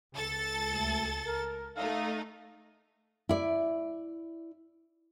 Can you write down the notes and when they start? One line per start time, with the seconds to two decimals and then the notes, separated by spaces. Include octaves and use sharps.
0.14 C#2 A4 A6
0.69 D2
1.26 A#4
1.77 A3 D#4 A4 E5 F5
3.29 E4 D5